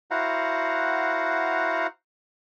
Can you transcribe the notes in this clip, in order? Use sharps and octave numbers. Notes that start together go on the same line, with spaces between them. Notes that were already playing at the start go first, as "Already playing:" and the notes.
E4 F#4 C5 F5 F#5 A#5